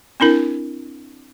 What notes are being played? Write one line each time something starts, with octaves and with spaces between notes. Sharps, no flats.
C4 D4 E4 A#4